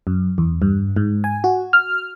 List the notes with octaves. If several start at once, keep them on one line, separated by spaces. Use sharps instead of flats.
F#2
E2
G2
G#2
G#5
F#4
F6